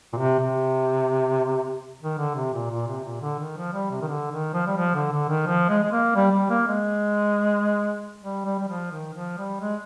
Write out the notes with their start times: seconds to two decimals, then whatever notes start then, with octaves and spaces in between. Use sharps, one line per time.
0.13 A#2
0.16 C3
0.39 C3
2.02 D#3
2.18 D3
2.35 C3
2.53 A#2
2.71 A#2
2.87 C3
3.04 A#2
3.21 D3
3.39 D#3
3.57 F3
3.73 G3
3.91 C3
4.01 D#3
4.08 D3
4.31 D#3
4.53 F3
4.67 G3
4.77 F3
4.95 D3
5.12 D3
5.28 D#3
5.46 F3
5.69 G#3
5.83 G#3
5.92 A#3
6.15 G3
6.32 G3
6.50 A#3
6.67 G#3
8.21 G3
8.45 G3
8.59 G3
8.68 F3
8.91 D#3
9.14 F3
9.37 G3
9.60 G#3